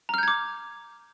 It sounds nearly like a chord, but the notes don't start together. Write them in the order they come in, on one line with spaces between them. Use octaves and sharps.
A#5 F6 G6 G#6 D6